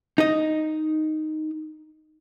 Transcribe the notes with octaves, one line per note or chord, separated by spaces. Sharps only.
D#4 D#5